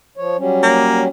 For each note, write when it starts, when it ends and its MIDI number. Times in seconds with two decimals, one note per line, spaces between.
0.17 0.37 53
0.17 0.37 73
0.39 1.08 54
0.39 1.08 55
0.39 1.08 61
0.63 1.03 58